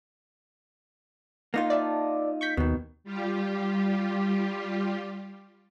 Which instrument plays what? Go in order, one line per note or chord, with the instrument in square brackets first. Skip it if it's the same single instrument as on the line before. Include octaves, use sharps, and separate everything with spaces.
[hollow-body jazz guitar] A#3 D#4 F4
[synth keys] D5 E5 A5
C#6 G6 B6
[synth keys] D#2 [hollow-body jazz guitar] B2 D#3
[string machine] G3 F4 G4